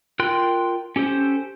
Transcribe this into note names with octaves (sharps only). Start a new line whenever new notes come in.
F4 A#4 G5 C6 F#6
C#4 G4 A4 C5